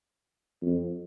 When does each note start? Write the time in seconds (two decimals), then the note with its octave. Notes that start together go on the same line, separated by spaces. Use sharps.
0.62 F2